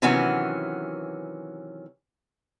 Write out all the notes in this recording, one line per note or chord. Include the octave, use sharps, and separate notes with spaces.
C3 D#3 E3 F#3 B3 C#4